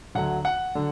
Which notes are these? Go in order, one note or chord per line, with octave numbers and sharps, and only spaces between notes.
D2 D3 F#3 F#5
F#5
D3 F#3